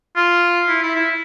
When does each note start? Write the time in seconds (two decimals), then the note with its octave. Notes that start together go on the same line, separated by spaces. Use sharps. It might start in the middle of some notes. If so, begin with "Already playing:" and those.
0.16 F4
0.69 E4
0.82 E4
0.96 E4